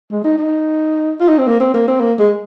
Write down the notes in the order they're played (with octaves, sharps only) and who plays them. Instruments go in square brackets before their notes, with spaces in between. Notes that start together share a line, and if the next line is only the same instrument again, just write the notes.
[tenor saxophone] G#3
D#4
D#4
F4
D#4
C4
A#3
C4
A#3
C4
A#3
G#3